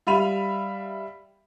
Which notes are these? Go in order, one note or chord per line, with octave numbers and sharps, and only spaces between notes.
G3 E5 F5 B5 D#7 F7